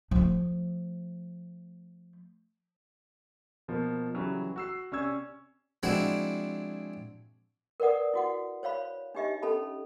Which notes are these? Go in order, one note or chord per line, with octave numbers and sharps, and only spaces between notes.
F3 A3
B2 F3 A#3
C#3 E3 F#3 G3
F#4 E6 C7
C3 C#4 D5 C#6 E6 G#6
F3 G#3 C4 D4 E4 F#4
A#4 B4 D5 F#5 D#6
E4 F#4 F#5
C5 C#5 F5 B5
D4 D#4 G4 D#5 E5
C#4 A4 A5 B5